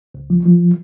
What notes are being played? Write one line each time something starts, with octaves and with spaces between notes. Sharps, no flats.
C#2
F3
F3